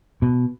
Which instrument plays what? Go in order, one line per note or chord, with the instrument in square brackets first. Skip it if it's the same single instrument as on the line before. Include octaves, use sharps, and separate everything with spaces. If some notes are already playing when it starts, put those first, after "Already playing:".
[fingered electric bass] B2